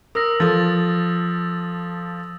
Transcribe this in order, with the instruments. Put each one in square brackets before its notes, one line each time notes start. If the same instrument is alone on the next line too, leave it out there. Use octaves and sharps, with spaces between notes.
[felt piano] A#4 [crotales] D#6 E6 A#6
[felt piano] F3 A4 [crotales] E6 A6